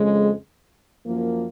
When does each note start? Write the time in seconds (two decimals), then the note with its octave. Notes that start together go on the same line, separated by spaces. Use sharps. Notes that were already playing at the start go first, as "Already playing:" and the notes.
Already playing: F2 C#3 G#3
1.06 F#2 F3 A#3